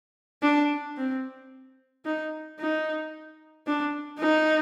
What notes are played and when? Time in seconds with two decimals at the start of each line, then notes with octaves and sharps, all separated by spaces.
0.42 D4
0.97 C4
2.05 D#4
2.59 D#4
3.67 D4
4.20 D#4